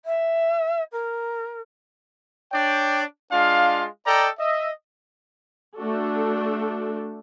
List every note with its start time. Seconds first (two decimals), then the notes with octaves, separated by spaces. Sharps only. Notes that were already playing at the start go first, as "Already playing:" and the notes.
0.05 E5
0.92 A#4
2.53 D4 C#5 D5 G5
3.32 G#3 D4 F4 F5
4.07 A4 D5 D#5 G5 A#5
4.40 D#5 E5
5.77 A3 D4 F#4 A4